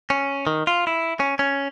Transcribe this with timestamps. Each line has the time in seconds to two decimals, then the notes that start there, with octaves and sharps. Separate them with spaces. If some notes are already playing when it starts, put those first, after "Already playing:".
0.10 C#4
0.47 D#3
0.67 F4
0.87 E4
1.20 C#4
1.39 C#4